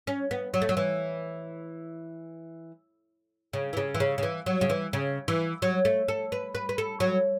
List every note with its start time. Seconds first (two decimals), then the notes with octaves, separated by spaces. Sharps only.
0.07 C#4
0.31 B3
0.54 F#3
0.62 A3
0.69 F#3
0.77 E3
3.53 C#3
3.73 E3
3.77 C#3
3.95 E3
4.00 C#3
4.18 C#3
4.23 E3
4.46 F#3
4.61 C#3
4.70 E3
4.93 C#3
5.28 E3
5.62 F#3
5.85 A3
6.08 A4
6.32 B4
6.55 B4
6.69 B4
6.78 A4
7.00 F#3